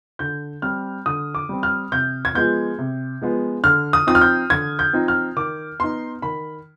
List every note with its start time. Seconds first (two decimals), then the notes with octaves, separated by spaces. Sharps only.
0.19 D3 G6
0.62 G3 C4 F6
1.06 D3 D#6
1.35 D6
1.49 G3 C4
1.63 F6
1.92 C3 G6
2.25 G#6
2.35 F3 G#3 B3 G6
2.78 C3
3.21 F3 G#3 B3
3.64 D3 F6
3.93 D#6
4.07 F3 C4 D#4 D#6
4.15 F6
4.21 G6
4.50 D3 G#6
4.79 G6
4.93 F3 C4 D#4
5.08 F6
5.37 D#3 D6
5.80 B3 D#4 C6
6.22 D#3 B5